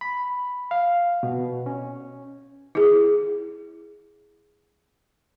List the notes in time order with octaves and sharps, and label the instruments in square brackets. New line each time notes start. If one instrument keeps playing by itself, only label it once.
[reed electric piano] B5
F5
B2
C#4
[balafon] E4 G#4